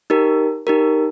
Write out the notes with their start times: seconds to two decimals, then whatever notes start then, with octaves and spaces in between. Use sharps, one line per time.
0.10 D#4 G4 A#4
0.67 D#4 G4 A#4